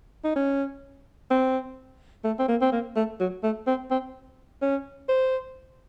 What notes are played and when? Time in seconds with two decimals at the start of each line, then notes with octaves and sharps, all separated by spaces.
0.24 D#4
0.36 C#4
1.31 C4
2.24 A3
2.39 C4
2.48 A#3
2.62 C4
2.72 A#3
2.96 A3
3.20 F#3
3.43 A3
3.67 C4
3.91 C4
4.62 C#4
5.09 C5